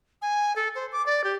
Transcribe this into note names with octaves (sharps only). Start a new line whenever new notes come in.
G#5
A4
C5
D6
D5
G4